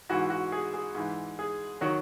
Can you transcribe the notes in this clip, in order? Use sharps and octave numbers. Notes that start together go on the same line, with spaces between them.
G#2 E3 F#4
F#4
G#4
G#4
G#2 E3
G#4
D#3 F#3 F#4